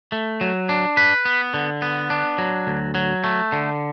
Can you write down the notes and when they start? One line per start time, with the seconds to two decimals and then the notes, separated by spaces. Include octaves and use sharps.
0.12 A3
0.41 F#3
0.69 D4
0.97 B4
1.25 B3
1.54 D3
1.82 B3
2.10 D4
2.38 F#3
2.67 D2
2.95 F#3
3.24 A3
3.52 D3